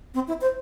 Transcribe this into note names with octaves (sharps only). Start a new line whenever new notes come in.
C4
E4
C5